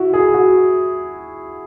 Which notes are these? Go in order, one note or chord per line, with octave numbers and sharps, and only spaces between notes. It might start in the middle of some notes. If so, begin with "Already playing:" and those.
Already playing: E4 F#4
G#4
F#4